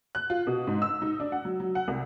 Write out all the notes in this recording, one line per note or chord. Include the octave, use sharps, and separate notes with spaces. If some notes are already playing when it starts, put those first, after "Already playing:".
F#6
F4
B2
G#2
E6
D#4
D4
F#5
F#3
F#3
F#5
C2